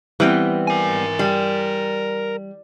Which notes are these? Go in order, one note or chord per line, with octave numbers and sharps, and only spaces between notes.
E3 G3 B3 C4 G5
A#4 G#5
G3